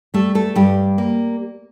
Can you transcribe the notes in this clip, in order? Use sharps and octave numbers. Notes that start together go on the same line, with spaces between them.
G3 A3 A4
A3 A4
G2 G3 G4
A#3